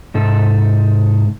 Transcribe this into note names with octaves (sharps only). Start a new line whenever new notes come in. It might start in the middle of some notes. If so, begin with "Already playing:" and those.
G#2 C3 D#4 A4